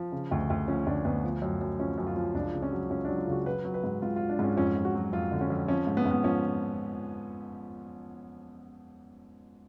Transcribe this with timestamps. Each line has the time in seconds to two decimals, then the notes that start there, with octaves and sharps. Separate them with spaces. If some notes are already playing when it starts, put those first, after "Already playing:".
Already playing: F3
0.12 C#3
0.31 D2
0.50 D2
0.68 F3 C#4
0.87 D2 D4
1.05 D2 B3
1.24 F3
1.42 F#2
1.61 F#2
1.80 F3 C#4
1.98 F#2
2.07 F4
2.16 F3
2.34 C#2 D4
2.54 C#3
2.62 C#4
2.72 F#3
2.90 C#2 C#4
3.05 D4
3.09 F#3
3.18 F4
3.27 C#3 F#4
3.46 F#3 B4
3.65 F#3
3.74 B4
3.84 G#2
4.02 G#2 F4
4.16 F4
4.21 F#3
4.29 D4
4.39 G#2 C#4
4.57 F2 C#4
4.76 F2
4.85 F#4
4.95 F#3
5.13 F2 F4
5.32 D3
5.41 C#4
5.50 F2
5.68 F3 C#4
5.87 G#2
5.97 B3
6.04 G#2 C#4
6.11 B3
6.24 F3 C#4